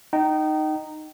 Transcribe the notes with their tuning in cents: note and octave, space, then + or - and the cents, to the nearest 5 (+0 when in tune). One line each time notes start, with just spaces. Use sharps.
D#4 -10 G5 -35